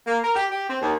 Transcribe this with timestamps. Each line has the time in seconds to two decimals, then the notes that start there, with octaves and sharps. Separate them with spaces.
0.07 A#3
0.24 A#4
0.36 G4
0.51 G4
0.70 C4
0.82 D#2